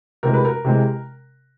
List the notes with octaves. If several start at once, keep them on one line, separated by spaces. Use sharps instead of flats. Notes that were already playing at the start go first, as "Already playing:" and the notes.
C3 E3 G#3 A#4
B4
A#4
C3 E3 G#3